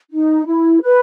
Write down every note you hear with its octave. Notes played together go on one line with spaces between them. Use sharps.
D#4
E4
B4